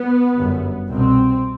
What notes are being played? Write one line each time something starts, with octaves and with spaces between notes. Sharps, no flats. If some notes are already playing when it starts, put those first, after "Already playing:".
Already playing: B3
G1 F#2
C2 B2 C4